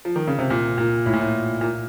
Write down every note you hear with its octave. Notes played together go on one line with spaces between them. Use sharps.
F3
D#3
C#3
C3
A#2
A#2
A2
A#2
A2
A#2